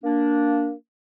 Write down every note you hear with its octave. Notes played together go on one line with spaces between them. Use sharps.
A#3 D4